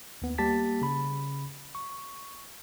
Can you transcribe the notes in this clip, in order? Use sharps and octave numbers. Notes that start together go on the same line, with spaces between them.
D#2 B3
G3 A#3 G4 A5 A6 B6
C#3 B5
C#6